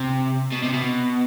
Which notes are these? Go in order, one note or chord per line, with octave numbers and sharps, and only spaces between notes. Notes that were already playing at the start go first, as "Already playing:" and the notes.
Already playing: C3
B2
C3
B2